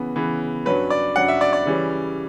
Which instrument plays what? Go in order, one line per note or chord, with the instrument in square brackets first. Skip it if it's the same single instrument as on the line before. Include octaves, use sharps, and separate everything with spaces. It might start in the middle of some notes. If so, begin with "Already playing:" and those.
Already playing: [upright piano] C#3 E3 B3
C#3 E3 B3
G2 F#3 C#4 B4
D5
G2 F#3 C#4 F#5
E5
D5
D5
C#3 E3 G3 C#4